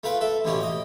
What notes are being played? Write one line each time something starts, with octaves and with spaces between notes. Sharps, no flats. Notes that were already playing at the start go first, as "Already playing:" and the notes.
A3 F4 B4 G5
A4 E5
A1 B2 E3 C#4 G4
D#5 G5